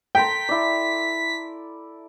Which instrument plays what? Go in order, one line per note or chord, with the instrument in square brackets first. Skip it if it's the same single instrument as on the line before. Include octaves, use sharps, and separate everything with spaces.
[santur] A4 A#5 C6 [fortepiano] G5 [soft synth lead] B6
[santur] E4 D5